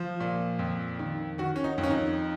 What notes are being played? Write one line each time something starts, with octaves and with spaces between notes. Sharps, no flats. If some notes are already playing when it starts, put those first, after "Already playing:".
Already playing: F3
A#2
F2
D#3
D#3 F#4
C#4
D#4
F2
C#4
D#4